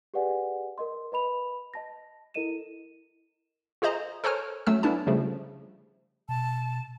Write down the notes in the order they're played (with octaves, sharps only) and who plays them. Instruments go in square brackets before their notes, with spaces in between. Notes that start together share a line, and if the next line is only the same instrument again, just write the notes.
[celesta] G4 G#4 B4 D5 F#5 G#5
A#4 D#5 C6
B4 D#5 B5 F7
D#5 A5 A#6
E4 A4 A#4 D#5 D#7 E7
[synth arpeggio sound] F4 G#4 C5 D#5 A#5
A4 A#4 C5 C#5 G#5 F6
F#3 A3 C#4 E6
B3 C#4 D4 E4 A5
C#3 F3 G3 A3
[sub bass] B2 [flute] A5